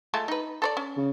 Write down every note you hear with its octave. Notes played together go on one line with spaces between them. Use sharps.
G#3 A3 F4
D#4 B4
A4 C5 D5
C#4
C#3